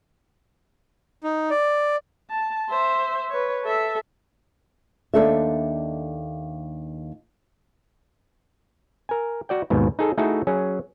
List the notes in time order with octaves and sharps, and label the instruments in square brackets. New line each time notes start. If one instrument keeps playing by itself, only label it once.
[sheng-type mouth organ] D#4
D5
[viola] A5
C5 E5
B4 C#5
A4 E5
[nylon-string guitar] D#2 D4 A4 E5
[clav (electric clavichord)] A#4 G#5
F#4 D5 G5
D#2 G#2 B2
D#4 G#4 A4
A3 D#4 E4 F#4 G#4 A4
F#3 C#4 G#4